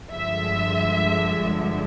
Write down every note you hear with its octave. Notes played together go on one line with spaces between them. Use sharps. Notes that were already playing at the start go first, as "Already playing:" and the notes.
G2 D3 F3 G#3 E5